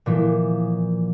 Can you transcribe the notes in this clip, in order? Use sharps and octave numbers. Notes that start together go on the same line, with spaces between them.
A#2 E3 F3